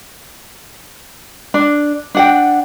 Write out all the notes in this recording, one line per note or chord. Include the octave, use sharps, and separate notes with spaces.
D4
D4 F#5 G5